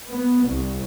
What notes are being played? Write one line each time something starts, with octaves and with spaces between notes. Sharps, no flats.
B3
C2